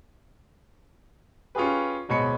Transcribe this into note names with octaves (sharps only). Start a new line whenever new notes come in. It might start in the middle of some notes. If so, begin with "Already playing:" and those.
C#4 F4 G4 G#4 B4
D1 B2 G#3 C#5 B5 C#7